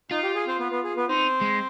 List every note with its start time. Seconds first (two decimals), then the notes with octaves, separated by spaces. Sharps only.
0.11 D#4 F4
0.23 G4
0.36 G#4
0.47 C4 C5
0.59 B3 B4
0.71 B3 B4
0.84 G#4
0.97 B3 B4
1.09 C4 D#4 C5
1.41 G#3